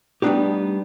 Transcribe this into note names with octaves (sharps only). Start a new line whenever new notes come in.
G3 A3 B3 D4 D#4 G4